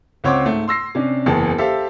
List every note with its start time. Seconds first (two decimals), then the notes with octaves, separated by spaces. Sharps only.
0.24 C#2 C4 C#5 F#5 C6 D6
0.46 G#2 A3
0.68 C6 E6 A#6 C7
0.95 C3 C#4 D4
1.26 F#1 E2 E3 G#4 A5
1.58 G4 A4 C5 E5 F5